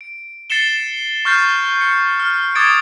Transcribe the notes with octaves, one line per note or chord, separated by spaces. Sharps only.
D7
A6 C7 C#7 E7 G7
C#6 F6 G6 A6 C7
C#7
F6
D6 D#6 G#6 A6 C#7 D7